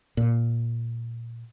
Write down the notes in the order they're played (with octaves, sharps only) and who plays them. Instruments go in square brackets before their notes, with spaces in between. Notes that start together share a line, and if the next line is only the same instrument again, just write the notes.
[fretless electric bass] A#2